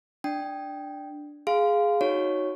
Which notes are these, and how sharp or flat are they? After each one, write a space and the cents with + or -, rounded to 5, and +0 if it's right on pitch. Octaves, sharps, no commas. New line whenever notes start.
D4 +0 G5 +0
G#4 +0 F5 +0 C6 -25
D#4 +0 F#4 +0 C#5 +0